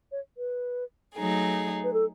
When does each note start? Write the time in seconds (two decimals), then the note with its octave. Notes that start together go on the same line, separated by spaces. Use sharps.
0.12 C#5
0.38 B4
1.16 F#3 A3 D#4 G#4
1.84 B4
1.93 A4